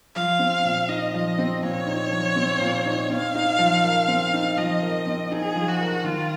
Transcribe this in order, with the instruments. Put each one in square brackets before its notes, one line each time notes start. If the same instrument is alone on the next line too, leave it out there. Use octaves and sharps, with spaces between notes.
[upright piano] F3 [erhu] F5
[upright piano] C4
A#2
[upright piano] D#4 [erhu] D#5
[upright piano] F3
C4
[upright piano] A#2 [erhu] C#5
[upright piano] D#4
F3
C4
A#2
D#4
[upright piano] C4 [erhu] F5
[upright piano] D#4
F3
A#4
C4
D#4
[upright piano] F3 [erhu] D#5
[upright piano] A#4
C4
[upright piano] D#4 [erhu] G#4
[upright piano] F3
[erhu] F#4
[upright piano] A#4
[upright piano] D#3 [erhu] F4